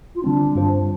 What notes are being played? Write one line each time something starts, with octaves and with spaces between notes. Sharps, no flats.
F4
D3 G3 C4 D4
G2 G3 F4 C5